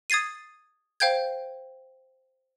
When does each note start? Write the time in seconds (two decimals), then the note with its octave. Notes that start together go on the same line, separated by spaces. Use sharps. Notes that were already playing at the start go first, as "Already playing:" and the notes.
0.10 D#6 G#6 A6 C7 D#7
1.00 C5 F5 G5 G6 G#6